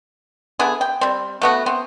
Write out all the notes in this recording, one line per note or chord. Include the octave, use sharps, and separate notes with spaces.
D3 B3 E4 G#4
G5
G3 C4
A3 B3 F#4
B3 C4